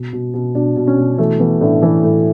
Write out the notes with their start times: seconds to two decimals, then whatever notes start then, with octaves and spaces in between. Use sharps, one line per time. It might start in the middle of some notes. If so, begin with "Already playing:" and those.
Already playing: B2
0.13 B2
0.34 B2
0.55 B2 D4
0.76 B2
0.87 C#4
0.97 B2
1.18 E3 A3
1.40 E3 B3
1.61 A2 D4
1.82 E3 A4
2.04 A2